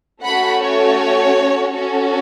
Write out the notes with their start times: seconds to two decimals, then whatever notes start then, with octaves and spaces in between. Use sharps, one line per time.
0.23 A3 C#4 F#4 A4 F#5 B5
0.61 C#5
1.71 C#4 F#4 A4